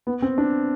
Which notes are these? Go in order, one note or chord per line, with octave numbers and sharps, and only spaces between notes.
B3
C4
D4